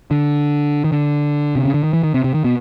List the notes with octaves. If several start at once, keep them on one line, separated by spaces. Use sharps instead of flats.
D3
D#3
D3
C3
C#3
D3
D#3
E3
D#3
C3
C3
D#3
B2